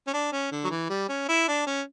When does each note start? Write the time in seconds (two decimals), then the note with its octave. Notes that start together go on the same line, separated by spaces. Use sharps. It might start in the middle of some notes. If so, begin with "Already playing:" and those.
0.07 C#4
0.13 D4
0.32 C#4
0.52 D3
0.64 F#3
0.70 E3
0.89 G3
1.09 C#4
1.28 E4
1.48 D4
1.66 C#4